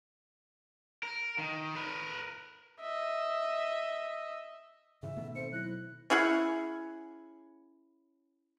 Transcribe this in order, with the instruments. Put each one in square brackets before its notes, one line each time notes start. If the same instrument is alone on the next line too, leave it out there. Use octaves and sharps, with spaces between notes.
[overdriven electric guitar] A#4
D#3
A#4 B4
[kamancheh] D#5 E5
[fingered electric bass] G#2 C#3 E3 [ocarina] E5
[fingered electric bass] B2 D#3 [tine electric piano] A3 B3
[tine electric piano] C4 A4 [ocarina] C5 [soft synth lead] C#7
[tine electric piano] F#3 A#6 [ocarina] E4 [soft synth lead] F#6
[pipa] C#4 E4 G#4 F#5